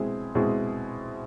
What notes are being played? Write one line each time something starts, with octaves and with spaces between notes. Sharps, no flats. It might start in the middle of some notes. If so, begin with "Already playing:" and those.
Already playing: B2 G#3 C4 E4 G#4
B2 G#3 C4 E4 G#4